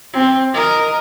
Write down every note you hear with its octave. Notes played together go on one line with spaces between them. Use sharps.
C4
A#4 D#5